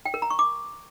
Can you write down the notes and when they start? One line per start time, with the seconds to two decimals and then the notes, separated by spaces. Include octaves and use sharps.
0.05 G5
0.14 A#4
0.22 A#5
0.30 C#6
0.39 D6